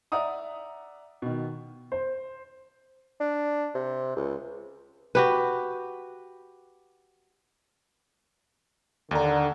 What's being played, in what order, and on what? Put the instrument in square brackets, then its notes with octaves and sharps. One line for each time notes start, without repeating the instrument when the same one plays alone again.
[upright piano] D5 E5 F#5 A#5 D#6
B2 D#3
C5
[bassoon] D4
C3
C#2
[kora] F#4 G4 B4
[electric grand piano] D#2 A#5 [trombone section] D3